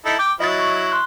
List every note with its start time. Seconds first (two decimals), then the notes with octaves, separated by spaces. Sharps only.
0.06 D#4 E4 A4
0.19 G5 D6
0.40 F#3 E4 D#5 A6
0.59 C#6
0.92 C6 F#6